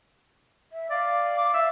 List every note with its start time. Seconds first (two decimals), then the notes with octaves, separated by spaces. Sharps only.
0.72 E5
0.90 D5 F5
1.37 D6
1.54 E5